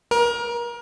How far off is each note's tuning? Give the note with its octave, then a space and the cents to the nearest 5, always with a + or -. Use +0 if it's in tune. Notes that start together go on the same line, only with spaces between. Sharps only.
A#4 +30